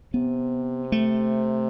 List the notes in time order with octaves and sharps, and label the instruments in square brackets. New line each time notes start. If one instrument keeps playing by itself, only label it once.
[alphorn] C3 [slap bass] B3
[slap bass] A3